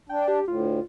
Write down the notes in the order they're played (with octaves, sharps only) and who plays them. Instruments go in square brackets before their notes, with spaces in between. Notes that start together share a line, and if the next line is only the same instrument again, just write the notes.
[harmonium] D4 [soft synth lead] G5
[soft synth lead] G4
[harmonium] D2 A2 [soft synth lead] F4